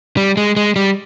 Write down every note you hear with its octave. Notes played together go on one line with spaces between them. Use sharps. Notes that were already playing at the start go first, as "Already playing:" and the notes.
G3
G#3
G#3
G3